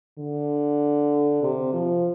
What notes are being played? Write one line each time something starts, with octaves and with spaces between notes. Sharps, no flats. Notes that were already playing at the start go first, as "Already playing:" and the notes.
D3
C3
F3